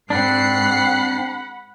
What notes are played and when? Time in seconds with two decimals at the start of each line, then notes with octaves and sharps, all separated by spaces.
0.10 G#2 C4 D4 F#5 B5 F#6 C7